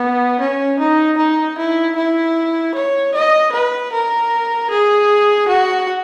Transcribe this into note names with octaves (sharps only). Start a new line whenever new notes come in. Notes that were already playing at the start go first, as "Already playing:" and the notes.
Already playing: B3
C#4
D#4
D#4
E4
E4
C#5
D#5
B4
A#4
G#4
F#4